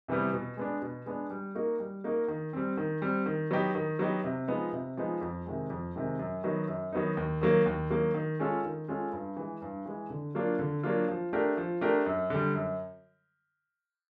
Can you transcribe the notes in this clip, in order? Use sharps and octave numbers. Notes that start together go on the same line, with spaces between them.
C3 E3 G3 B3
B2
G#3 B3 D4
B2
G#3 B3 D4
G3
A#3 D#4 F#4 A#4
G3
A#3 D#4 F#4 A#4
D#3
G3 C4
D#3
G3 C4
D#3
F#3 B3 D#4 G4
D#3
F#3 B3 D#4 G4
C3
F3 G#3 B3 D#4
C3
F3 G#3 B3 D#4
F2
C3 D#3 G#3
F2
C3 D#3 G#3
F#2
D#3 F#3 B3 D#4
F#2
D#3 F#3 B3 D#4
D#2
D#3 F#3 A#3
D#2
D#3 F#3 A#3
D#3
G#3 C#4 F4 A4
D#3
G#3 C#4 F4 A4
G2
E3 G#3
G2
E3 G#3
D3
F#3 A#3 D4 F4
D3
F#3 A#3 D4 F4
F3
A3 D4 G4 A#4
F3
A3 D4 G4 A#4
F#2
D3 G3
F#2